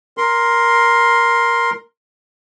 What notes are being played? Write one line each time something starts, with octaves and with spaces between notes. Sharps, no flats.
A#4 C6